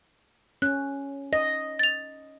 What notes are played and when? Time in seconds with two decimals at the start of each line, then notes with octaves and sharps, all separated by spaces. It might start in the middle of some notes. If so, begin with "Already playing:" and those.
0.62 C#4 F#6
1.33 D#5 A#6
1.79 A6 F7